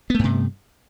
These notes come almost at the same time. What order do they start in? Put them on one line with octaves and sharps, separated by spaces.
B3 A3 G2 C3